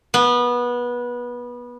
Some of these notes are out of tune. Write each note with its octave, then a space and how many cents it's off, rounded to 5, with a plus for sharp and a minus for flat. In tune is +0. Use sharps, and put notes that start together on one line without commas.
B3 -20